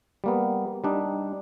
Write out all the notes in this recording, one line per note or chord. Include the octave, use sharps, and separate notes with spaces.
G3 A#3 B3
G3 D4 D#4